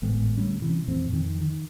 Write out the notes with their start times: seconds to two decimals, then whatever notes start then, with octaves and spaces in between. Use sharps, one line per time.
0.02 G#1 A2 G#3 B3
0.37 D2 G3 C#4
0.62 C3 E3
0.88 F2 A#2 E3 C4
1.09 F2 D#3
1.41 D#3